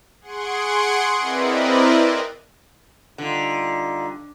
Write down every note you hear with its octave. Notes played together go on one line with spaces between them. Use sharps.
G#4 F#5 C6 C#6 D7
C4 E4 A#4 B4 D5 D#5
D3 G3 D#4 F4